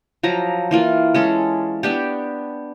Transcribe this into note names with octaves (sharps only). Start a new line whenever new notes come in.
F3 F#3 A#5
E3 A#3 F4
G#3 C#4 A4
B3 D4 G4